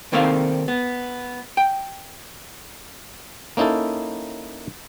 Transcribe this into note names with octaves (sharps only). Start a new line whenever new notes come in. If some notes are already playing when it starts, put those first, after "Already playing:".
C2 D#3 A#3 C4 A4 F5
B3
G5
A#3 C#4 D#4 E4 A4